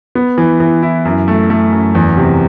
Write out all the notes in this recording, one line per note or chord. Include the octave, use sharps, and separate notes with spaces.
B3
E3
E3
E4
F#2
A3
A3
F#2
E2
C3